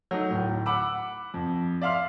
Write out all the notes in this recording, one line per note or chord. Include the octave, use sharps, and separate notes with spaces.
F#3 A3 D#4
D1 A2
F#5 B5 D6 E6
F2
D5 E5 F5 C6 F6